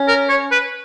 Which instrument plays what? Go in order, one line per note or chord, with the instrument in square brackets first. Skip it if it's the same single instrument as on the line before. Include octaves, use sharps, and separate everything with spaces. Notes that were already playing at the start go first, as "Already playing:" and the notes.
Already playing: [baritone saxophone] C#4
[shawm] A#4
C#5
B4